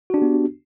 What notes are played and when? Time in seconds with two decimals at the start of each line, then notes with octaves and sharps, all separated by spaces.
0.10 F#4
0.14 D4
0.18 G4
0.22 B3